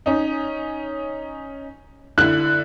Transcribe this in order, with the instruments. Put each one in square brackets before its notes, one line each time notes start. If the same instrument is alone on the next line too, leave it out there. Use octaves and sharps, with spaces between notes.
[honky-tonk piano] C#4 D#4
[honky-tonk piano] D3 E4 [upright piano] F#6